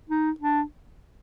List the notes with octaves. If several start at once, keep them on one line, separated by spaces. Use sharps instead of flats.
D#4
D4